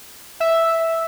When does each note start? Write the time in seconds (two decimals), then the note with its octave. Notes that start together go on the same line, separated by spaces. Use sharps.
0.40 E5